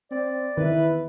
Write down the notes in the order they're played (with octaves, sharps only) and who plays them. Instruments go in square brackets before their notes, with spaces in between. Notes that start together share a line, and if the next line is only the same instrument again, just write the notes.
[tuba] C4 [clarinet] D5
[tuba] E2 [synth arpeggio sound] D#3 [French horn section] E4 B4